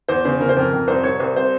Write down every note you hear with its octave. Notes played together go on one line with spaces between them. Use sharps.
E2 C5
C#3 C5
C#3 A#4
C5
F2 A#4
F2
C2 C5
C2 C#5
C2 C5
C3 C5